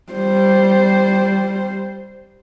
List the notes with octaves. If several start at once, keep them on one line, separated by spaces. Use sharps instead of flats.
G3 C5